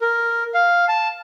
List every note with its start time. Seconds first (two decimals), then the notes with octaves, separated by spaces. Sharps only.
0.01 A#4
0.54 F5
0.88 A5